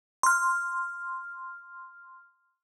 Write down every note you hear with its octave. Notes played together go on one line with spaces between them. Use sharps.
C6 F6